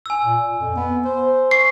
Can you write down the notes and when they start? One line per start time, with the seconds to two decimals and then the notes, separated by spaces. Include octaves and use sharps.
0.06 G#5 E6
0.24 A#2
0.60 F2
0.76 B3
1.05 C5
1.51 C#6 C7